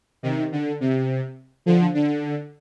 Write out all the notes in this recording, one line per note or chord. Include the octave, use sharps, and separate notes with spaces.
C3 D#3
D3
C3
D3 F3
D3